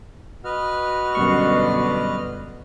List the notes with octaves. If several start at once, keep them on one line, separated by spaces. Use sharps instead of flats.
F#4 B4 D#5 F6
F#2 B2 D3 G3 C#6